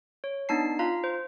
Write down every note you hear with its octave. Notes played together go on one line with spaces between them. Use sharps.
C#5
B3 D4 D#4 A5 C7
F4 F5 A#5
C5